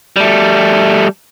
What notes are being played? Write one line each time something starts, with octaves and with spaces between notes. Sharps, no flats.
G3 A3